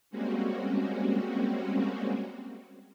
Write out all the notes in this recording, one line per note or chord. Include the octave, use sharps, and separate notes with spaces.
G3 G#3 A#3 C4 C#4 F#4